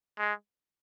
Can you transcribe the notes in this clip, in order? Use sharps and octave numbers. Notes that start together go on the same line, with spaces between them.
G#3